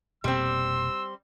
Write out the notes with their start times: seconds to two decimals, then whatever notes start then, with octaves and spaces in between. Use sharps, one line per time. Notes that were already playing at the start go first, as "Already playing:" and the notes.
0.24 F1 B2 G3 A#3 C4 C6 E6